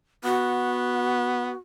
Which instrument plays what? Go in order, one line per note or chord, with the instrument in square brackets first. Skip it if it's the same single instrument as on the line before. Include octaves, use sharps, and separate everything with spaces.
[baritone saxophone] B3 [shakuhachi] F#4